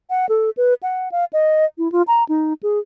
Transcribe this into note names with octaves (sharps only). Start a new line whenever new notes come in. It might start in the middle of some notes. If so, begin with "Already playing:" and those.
F#5
A4
B4
F#5
F5
D#5
E4
F4
A#5
D#4
G#4